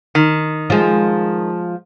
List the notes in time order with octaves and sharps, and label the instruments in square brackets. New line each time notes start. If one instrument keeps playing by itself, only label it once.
[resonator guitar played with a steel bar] D#3
[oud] F3 G#3